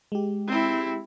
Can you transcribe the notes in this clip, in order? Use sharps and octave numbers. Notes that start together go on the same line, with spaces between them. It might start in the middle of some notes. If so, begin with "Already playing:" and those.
G#3 G4
C4 E4